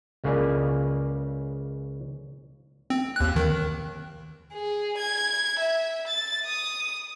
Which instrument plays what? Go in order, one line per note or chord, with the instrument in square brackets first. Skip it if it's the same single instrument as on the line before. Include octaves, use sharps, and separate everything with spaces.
[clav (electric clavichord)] C#2 C#3 A#3 G#4 D5 G#5
[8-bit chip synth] C4
D#2 F#6
D#3
[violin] G#4
G#6
E5
A6
D#6